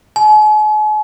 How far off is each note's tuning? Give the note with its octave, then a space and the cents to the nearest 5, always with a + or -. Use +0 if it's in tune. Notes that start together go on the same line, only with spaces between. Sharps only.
G#5 +45